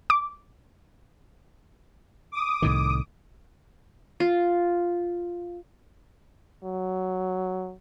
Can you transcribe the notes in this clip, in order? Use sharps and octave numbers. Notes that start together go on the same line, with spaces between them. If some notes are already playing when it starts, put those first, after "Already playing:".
D6
D6 D#6
C2 A2 D#3
F4
F#3